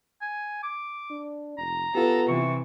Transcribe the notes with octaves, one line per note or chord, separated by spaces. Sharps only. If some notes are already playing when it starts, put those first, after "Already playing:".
G#5
D6
D4
F1 A#5
B3 F4 G4 A4
C3 E3 C#6